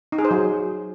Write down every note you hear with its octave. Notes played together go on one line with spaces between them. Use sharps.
D#4
G#4
C5
F#3